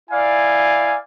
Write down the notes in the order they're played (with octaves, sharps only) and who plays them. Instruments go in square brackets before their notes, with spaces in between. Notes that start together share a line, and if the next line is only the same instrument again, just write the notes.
[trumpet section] E4 D5 F5 G#5